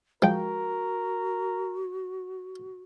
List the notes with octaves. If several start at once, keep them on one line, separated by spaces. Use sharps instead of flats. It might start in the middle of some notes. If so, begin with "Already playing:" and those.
F3 G#3 F#4 A#4 G5